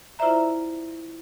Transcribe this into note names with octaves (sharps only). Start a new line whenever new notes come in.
E4 F4 C5 D5 E5 A#5